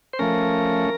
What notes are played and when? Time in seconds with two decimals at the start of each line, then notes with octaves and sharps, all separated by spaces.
0.13 C5
0.19 F3 A3 C#4 A#4